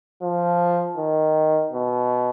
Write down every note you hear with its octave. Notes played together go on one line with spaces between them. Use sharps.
F3
D#3
B2